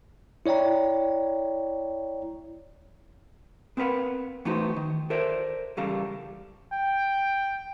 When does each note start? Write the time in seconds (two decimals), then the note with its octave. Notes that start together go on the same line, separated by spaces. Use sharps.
0.46 E4 C#5 D5 G5 A#5
3.77 B3 C4 A#4 B4 F5 F#5
4.45 E3 A3 B3 D#4 F#4 C5
4.76 D#3
5.10 A4 A#4 C5 D5 E5
5.77 E2 C#3 G3 A4 F5 A#5
6.73 G5